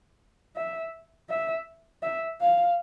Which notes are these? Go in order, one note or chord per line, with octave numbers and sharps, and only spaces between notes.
E5
E5
E5
F5